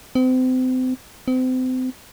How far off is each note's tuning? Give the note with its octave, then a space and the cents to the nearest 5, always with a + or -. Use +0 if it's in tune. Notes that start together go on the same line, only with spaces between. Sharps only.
C4 -35
C4 -35